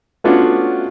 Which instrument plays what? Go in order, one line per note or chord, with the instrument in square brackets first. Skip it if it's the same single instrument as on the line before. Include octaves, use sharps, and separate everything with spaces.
[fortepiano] A3 B3 C#4 D4 F4 F#4